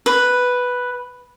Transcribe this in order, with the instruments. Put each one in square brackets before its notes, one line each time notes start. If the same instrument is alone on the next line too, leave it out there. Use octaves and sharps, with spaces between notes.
[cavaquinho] B4